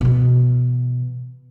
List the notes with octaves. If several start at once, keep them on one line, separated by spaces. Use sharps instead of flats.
B2 E3